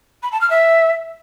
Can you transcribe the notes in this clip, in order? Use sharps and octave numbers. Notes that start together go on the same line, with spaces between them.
B5
A5
F6
E5